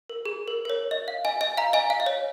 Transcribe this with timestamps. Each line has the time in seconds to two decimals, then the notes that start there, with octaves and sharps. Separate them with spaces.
0.10 A#4
0.26 G#4
0.48 A#4
0.65 A#4
0.70 C#5
0.91 D#5
1.08 F5
1.25 D#5 G#5
1.41 D#5 G#5
1.57 F5 A#5
1.73 D#5 G#5
1.90 F5
2.00 D#5
2.06 C#5